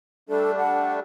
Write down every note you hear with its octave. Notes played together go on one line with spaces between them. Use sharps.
G3 A3 D4 A4
F#5